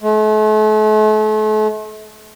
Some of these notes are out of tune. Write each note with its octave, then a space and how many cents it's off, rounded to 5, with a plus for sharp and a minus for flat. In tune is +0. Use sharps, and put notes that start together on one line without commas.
A3 -40